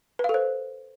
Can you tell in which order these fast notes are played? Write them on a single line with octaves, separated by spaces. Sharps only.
B4 F5 A4 C5